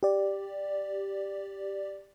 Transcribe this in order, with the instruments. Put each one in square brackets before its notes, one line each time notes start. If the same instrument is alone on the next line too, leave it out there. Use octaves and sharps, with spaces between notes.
[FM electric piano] G4 D5